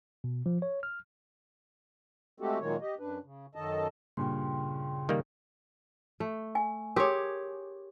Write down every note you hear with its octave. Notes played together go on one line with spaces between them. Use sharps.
B2
F3
C#5
F6
G#3 A3 C4 F#4 G4 A4
A#2 D#3 F#3 G#3 A#3 C#5
G4 D#5
F#2 D4 B4
C#3
F#2 D#3 A4 D#5 A5
G2 A#2 C#3 G5 C6
D#3 G3 A#3
A3
G#5
G4 G#4 A#4 C#5 C6 D6